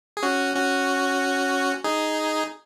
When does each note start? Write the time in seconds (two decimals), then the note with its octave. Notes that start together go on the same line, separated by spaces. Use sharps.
0.17 G#4
0.23 C#4 F#4
0.55 C#4 F#4
1.84 D#4 G#4